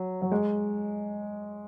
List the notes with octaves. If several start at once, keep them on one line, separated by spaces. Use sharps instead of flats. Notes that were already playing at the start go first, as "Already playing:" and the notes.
Already playing: F#3
F#3
G#3